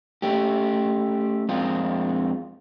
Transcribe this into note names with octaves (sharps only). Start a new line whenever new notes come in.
A3 C#4 G4
F2 G#3 C4 F4